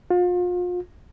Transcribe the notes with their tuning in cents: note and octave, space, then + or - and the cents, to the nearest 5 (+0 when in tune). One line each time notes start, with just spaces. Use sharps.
F4 +35